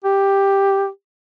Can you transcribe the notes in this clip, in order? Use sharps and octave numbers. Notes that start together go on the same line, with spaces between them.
G4